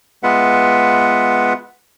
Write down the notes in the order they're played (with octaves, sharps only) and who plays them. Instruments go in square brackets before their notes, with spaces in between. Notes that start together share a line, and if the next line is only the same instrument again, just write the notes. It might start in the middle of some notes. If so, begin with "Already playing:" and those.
[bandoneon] G#3 B3 F4 B4 E5 F#5